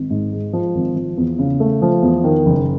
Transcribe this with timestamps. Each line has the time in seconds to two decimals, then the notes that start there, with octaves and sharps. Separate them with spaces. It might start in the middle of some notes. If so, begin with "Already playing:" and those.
Already playing: G#1
0.11 G#2
0.32 G#3
0.53 F3
0.75 G#1
0.96 F3
1.17 E2
1.39 C#3
1.60 A3
1.82 F3
2.02 E2
2.24 D#3
2.46 F#1